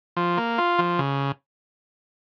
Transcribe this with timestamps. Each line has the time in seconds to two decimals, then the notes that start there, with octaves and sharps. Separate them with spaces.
0.17 F3
0.37 A#3
0.58 F4
0.78 F3
0.98 C#3